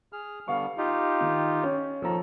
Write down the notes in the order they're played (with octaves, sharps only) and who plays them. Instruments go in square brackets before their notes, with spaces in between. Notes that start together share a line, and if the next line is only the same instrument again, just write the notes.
[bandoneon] G#4 F6
[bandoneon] D3 G3 B3 [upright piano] F5 C#6
[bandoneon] D#4 F4 G4
[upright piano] D#3
C#4
[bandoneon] D#2 D#3 A4 [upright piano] F3 A#5